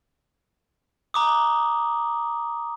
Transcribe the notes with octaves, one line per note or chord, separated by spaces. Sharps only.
A#5 D6 D#6